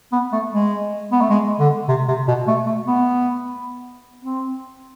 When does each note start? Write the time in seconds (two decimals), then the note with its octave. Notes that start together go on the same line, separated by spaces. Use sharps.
0.12 B3
0.33 A3
0.53 G#3
1.12 B3
1.21 A3
1.30 G#3
1.59 D3
1.88 C3
2.08 C3
2.28 B2
2.48 A3
2.67 A3
2.87 B3
4.23 C4